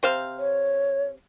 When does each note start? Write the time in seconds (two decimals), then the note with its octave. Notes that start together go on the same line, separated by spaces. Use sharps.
0.03 C3 C5 F5
0.38 C#5